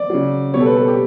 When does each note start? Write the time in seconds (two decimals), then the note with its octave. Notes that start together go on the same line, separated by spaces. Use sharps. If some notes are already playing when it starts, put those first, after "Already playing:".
Already playing: D5
0.10 C#3 F#3
0.54 B2 G3 C#5
0.60 A4
0.66 B4
0.76 A4
0.88 G4